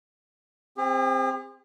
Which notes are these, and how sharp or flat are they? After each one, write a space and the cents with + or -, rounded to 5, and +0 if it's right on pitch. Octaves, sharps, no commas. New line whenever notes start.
C4 +0 G#4 -45